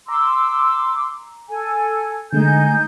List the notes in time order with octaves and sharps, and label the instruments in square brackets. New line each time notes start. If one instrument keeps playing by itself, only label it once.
[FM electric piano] A#5 [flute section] C6 D6 E6
[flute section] A4 G#5
[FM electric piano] D3 G#3 A3 [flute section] D#4 G#5 G6